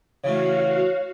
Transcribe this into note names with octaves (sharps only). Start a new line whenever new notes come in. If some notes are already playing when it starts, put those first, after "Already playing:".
C#3 E3 A3 F#4 C#5 F5